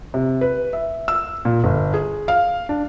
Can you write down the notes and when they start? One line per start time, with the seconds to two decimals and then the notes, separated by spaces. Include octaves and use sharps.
0.14 C3
0.41 B4
0.73 E5
1.08 E6
1.45 A#2
1.64 G1
1.94 G#4
2.28 F5
2.69 D4